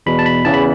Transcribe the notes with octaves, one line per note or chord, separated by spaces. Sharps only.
E2 B2 B5
A5
B5
E2 C#3 E3 A5
B5